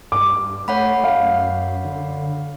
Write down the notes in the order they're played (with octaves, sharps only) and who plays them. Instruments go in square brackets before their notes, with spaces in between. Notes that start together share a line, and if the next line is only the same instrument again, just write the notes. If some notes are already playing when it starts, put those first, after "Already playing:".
[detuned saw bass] G2 [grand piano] D6
[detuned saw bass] A3 [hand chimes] C#5 F#5 B5
[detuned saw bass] F#2 [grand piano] F5
[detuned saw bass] D3